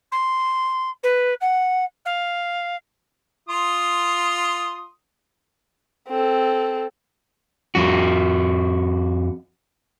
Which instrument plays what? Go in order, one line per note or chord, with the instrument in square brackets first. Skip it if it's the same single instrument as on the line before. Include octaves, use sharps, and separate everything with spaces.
[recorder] C6
B4
F#5
F5
[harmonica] F4 C6 D#6
[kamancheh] C4 A4
[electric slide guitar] F2 F#4